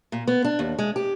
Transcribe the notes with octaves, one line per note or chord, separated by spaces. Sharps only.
A#2
B3
D4
D#2
G#3
G4